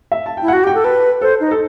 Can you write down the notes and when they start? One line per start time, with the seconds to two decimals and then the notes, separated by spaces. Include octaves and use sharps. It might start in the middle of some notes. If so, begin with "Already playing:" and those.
0.12 E5
0.26 A5
0.37 G5
0.42 E4
0.48 F#5
0.53 F#4
0.64 G4 G5
0.74 A4
0.84 B4 A5
1.21 A4 C5
1.40 D#4
1.51 A4